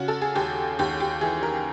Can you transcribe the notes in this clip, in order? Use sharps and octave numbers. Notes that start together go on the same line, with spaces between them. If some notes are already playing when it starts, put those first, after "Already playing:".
Already playing: C#3 F#4
A4
G#4
D#2 G4
D#2 G4
G4
E3 G#4
A#4